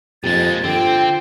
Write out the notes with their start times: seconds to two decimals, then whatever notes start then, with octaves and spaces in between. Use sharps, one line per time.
0.24 F2 A#2 G#3 G4 A6
0.64 D3 C4 F4 G5